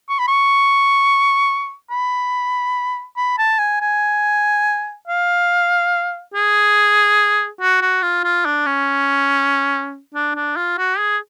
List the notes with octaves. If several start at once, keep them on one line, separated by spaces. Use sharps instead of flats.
C#6
B5
C#6
B5
B5
A5
G#5
G#5
F5
G#4
F#4
F#4
F4
F4
D4
C#4
D4
D4
F4
F#4
G#4